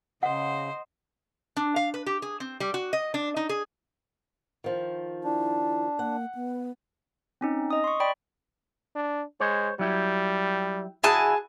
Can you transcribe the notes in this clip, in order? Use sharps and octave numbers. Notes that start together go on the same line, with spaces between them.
C#3 C5 D#5 F#5
D4
F5
B4
G4
G#4
C4
G3
F#4
D#5
D4
D#4
G#4
D#3 F3
D4 E4
A#3 F#5
B3
C4 C#4 D#4
D#5 D#6
C6 C#6
D5 G5 B5
D4
G#3 C5 C#5
F#3 G3 E4 G4
E4 F#4 G#4 G#5 A5